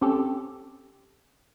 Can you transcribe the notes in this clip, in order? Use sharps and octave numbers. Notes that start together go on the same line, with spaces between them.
C4 C#4 G4 A4